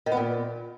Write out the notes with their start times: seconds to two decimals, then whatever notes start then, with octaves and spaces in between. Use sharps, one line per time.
0.06 D#3
0.12 B3
0.17 A#2